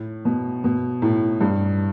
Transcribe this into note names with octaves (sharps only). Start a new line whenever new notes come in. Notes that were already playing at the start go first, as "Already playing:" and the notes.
Already playing: A2
B2
B2
A2
G2